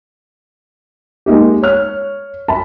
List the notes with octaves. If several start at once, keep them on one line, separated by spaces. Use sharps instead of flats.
G#3 A#3 D#4 G4
C#5 F6
A5 B5